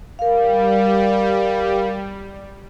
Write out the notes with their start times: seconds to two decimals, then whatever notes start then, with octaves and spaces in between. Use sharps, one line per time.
0.19 G3 A#4 F5